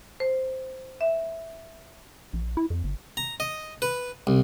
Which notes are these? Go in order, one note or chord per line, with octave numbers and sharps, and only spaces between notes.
C5
E5
A#1
E4
F2
G1
A#5
D#5
B4
C2